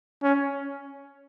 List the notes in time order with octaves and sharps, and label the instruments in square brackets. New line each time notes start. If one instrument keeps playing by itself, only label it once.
[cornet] C#4